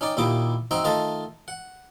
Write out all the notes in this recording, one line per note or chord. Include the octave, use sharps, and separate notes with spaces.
C#4 D#4 D5 G5
D#2 A#2 E4 G4 D6 D#6
C4 D#4 F#4 E5 G5 A#5
D#3 A3 F4 D#5 A5 A#5
F#5